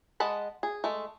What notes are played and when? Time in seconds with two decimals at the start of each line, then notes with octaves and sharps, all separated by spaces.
0.20 G#3 D#5 F#5 A5 B5
0.63 G#4
0.84 G#3 A3